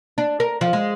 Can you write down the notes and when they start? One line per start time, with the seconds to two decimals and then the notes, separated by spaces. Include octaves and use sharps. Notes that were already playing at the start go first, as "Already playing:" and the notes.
0.18 D4
0.40 A#4
0.61 F3
0.73 G#3